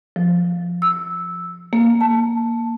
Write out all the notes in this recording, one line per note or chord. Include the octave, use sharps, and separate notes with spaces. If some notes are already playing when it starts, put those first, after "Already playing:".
F3
E6
A#3
A5